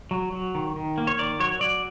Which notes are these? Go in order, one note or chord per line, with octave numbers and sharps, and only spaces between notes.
F#3
F#3
D#3
D#3
A#3
C#5
D#3 D5
F#3 C#5
F#3 D5